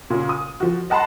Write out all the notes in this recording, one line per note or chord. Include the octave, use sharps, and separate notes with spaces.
A#2 C#3
D#6
F3 F#4
D#5 F#5 A5 B5 C6